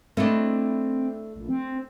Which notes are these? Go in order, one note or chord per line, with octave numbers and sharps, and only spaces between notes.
A3 C4 D4 E4 D#5
A#1
C4